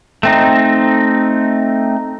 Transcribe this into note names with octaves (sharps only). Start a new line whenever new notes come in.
A3 C4 D#4